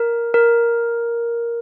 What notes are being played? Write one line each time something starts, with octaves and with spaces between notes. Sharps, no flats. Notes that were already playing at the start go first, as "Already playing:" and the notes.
Already playing: A#4
A#4